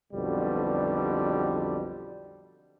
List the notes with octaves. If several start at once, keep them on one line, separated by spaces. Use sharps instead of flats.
B1 F2 B2 D3 G3